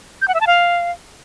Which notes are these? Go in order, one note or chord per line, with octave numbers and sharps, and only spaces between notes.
G6
F#5
E5
A5
F5